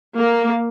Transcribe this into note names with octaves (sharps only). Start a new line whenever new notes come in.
A#3